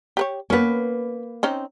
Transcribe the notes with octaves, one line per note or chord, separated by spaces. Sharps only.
G4 B4 C#5
A#3 B3 C#4 B4
C4 C#4 D#4